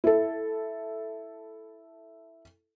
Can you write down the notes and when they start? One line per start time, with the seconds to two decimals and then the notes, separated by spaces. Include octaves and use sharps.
0.04 E4 A4